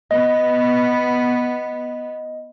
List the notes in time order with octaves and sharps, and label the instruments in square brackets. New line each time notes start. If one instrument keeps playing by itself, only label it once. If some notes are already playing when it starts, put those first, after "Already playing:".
[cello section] B3 [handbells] D#5